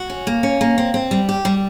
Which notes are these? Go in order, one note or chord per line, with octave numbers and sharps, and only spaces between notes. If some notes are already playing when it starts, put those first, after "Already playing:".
Already playing: F#4
C#4
A#3
C#4
A#3
C4
C4
G3
G4
G3